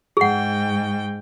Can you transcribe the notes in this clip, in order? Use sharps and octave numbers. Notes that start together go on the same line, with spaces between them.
G#2 G#4 F#5 G5